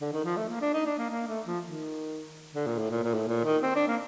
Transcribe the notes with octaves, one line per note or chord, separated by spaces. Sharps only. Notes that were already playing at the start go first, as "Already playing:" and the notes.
D3
D#3
F3
A3
A#3
D4
D#4
D4
A#3
A#3
A3
F3
D#3
D3
A#2
A2
A#2
A#2
A2
A#2
D#3
C4
D4
A#3